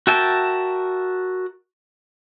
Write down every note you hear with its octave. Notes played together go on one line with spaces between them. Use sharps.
F#4 A#4 E5 G5 A5